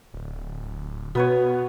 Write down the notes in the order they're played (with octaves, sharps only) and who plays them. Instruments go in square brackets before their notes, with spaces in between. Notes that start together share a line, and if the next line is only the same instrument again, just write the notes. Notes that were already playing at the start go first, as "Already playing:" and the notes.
[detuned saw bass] D1
[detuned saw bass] B2 [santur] B3 B4 C#5 [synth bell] F#4